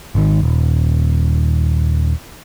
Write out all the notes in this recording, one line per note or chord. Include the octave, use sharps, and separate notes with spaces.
G#1 D#3
D#1